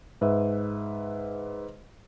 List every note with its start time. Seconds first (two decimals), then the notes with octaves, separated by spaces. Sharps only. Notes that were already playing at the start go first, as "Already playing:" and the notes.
0.21 G#2 B4 E5